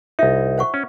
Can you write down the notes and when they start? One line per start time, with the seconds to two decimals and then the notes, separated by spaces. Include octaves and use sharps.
0.19 C2 D#4 F4 E5
0.58 C5 F#5 C#6
0.74 C#4